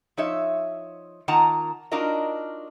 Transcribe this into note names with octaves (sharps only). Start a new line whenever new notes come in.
F3 D#4 C#5 E5
D#3 A#3 F4 F#5 A5 A#5
D4 D#4 F4 F#4 A#4 D#5